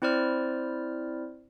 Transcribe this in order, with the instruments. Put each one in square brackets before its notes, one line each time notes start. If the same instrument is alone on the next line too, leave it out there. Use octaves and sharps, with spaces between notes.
[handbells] C4 E4 C5 D5 F6